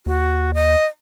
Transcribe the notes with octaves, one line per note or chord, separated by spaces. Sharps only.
D#2 F#4
D#5